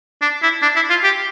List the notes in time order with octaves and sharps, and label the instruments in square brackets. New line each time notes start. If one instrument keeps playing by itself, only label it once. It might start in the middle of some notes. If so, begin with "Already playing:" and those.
[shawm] D4
E4
D4
E4
F4
G4